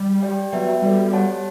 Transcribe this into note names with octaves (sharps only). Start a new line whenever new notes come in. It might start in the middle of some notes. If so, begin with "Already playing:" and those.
Already playing: G3
G4 D5 G5
F#3 B3 F#4 B4 E5 G5
G3 B3 F#4 A4 D5
G4 C#5 F#5 A5